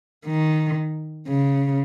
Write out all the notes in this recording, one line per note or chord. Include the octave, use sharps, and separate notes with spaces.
D#3
C#3